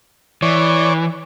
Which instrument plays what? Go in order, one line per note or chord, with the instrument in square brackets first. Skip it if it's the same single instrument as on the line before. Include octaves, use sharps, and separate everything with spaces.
[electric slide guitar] E3 [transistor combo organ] C#5 D5